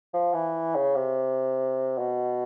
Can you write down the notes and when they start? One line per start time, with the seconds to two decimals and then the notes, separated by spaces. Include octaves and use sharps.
0.13 F3
0.34 E3
0.75 C#3
0.96 C3
1.98 B2